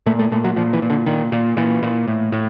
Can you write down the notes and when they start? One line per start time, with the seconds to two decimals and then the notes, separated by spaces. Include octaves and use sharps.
0.06 A#2 A3
0.19 A3
0.32 A#2 A3
0.44 F#3
0.56 A#2 F3
0.73 E3
0.82 A#2
0.90 D3
1.06 A#2 D#3
1.32 A#2
1.57 A#2 E3
1.82 A#2
2.08 A2
2.32 A2